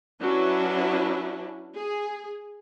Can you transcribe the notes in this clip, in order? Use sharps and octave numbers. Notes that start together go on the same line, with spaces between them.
F#3 C#4 D4 E4 B4
G#4